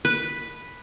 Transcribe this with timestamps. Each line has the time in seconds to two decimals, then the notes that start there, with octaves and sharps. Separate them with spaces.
0.05 B4